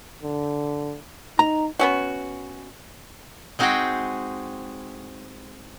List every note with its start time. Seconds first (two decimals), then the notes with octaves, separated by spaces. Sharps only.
0.23 D3
1.39 D#4 A#5
1.79 B3 C#4 F#4
3.59 G#3 C4 D#4 F#4 G#4 G5